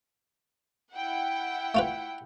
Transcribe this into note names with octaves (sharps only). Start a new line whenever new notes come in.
E4 F#5 G5
A3 F4 B4